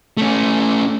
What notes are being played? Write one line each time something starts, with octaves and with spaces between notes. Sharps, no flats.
A3 C#4